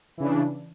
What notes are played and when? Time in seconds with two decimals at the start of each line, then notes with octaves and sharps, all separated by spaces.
0.18 E3
0.20 C#3
0.23 D4